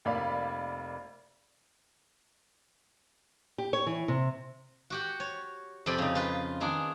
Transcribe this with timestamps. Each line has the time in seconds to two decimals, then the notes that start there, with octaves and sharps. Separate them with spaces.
0.05 F1 A#3 D5 F5 B5
3.58 G4
3.73 C#5
3.86 E3
4.08 C3
4.90 F#4 G4 F#5
5.20 C#5
5.86 F2 C3 C4 D5 B5
5.98 C#3 D#4
6.15 F4 B4
6.60 D#3 A#3 D4 G#4